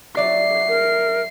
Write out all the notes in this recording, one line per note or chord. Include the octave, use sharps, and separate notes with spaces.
F#3 D5 E5 C7
A#4